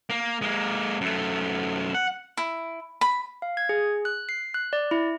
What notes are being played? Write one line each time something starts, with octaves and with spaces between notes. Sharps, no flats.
A#3
G#3 A#3
F#2 A3
F#5
E4
B5
F5
G#6
G#4
F#6
C7
F#6
D5
E4